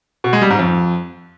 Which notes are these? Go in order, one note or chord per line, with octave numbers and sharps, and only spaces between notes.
B2
G#3
G3
G#2
F2